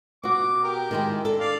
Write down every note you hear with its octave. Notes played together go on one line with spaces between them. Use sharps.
B2 F#4 D6
G4 A#4
D#3 G#3 E4
D4 A4
D5 F5